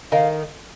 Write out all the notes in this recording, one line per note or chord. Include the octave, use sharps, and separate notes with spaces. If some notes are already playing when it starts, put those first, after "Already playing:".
D#3 F5